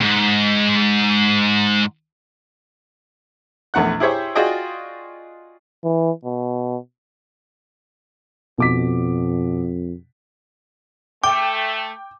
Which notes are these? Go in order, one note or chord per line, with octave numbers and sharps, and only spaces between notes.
D#2 G#2
A#1 E2 A3 F#5 F#6
E4 G4 G#4 C5 C#5 E5
F4 F#4 G#4 D5 D#5 G5
E3
B2
F2 B2 D6 B6
A3 G5 D6